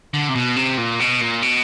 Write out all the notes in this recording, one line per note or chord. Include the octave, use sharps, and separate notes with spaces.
D3
C3
B2
C3
A#2
B2
A#2
B2